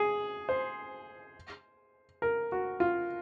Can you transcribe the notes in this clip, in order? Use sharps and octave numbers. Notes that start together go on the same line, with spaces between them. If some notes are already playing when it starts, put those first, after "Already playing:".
Already playing: G#4
C5
A#4
F#4
F4